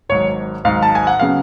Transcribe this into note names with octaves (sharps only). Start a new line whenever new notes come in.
G#1 G#2 F#3 C#5
G#1 G#2 F#3 F5
A5
G#5
F#5
C#3 F#3 B3 F5